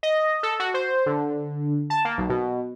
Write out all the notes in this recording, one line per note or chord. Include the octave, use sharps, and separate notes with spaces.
D#5
A4
F#4
C5
D3
A5
A#3
B1
B2